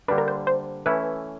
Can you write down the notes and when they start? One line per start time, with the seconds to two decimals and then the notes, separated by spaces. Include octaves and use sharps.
0.08 D3 G3 A#3 D4 B4
0.18 A#4
0.28 C5
0.47 C5
0.86 E3 A3 C#4 E4 B4